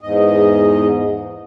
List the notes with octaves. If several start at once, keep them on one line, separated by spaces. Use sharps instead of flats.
E2 G#2 D#5